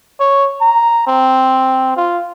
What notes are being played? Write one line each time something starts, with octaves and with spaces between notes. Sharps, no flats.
C#5
A#5
C4
F4